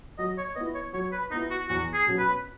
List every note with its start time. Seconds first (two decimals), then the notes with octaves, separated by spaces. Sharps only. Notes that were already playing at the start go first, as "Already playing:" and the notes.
0.18 F#3 D#5
0.38 C#5
0.56 B3 D#5
0.61 E4
0.75 C#5
0.93 F#3 C#5
1.12 B4
1.31 B3 D#4
1.35 E4
1.51 F#4
1.69 E2 F#4
1.94 G#4
2.07 B2 F#3 C#4
2.19 B4